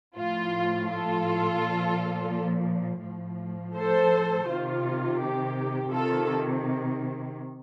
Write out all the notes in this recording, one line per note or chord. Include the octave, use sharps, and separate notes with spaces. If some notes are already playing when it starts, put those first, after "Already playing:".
A2 F3 F4
F4 A4
A#2 F3
A2 F3
A4 C5
C3 D#3 F4
G4
C3 D#3 F4 A4